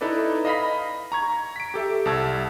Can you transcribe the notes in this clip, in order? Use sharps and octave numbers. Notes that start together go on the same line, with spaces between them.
D#4 E4 A4 B4 D5
D#5 F5 B5 A#6 B6
A#5 C#6 G#6
B6 D7
G4 A4 E5
C2 A5 E6 G#6